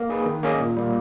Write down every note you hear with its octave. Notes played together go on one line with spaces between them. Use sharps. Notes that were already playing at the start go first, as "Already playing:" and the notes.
Already playing: A#3
D#4 G#4 B4
D#3
A#3 C#4 G#4 D#5
A#2
G3 A#3